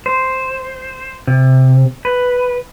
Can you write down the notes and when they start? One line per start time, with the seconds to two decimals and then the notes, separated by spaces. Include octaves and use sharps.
0.06 C5
1.27 C3
2.05 B4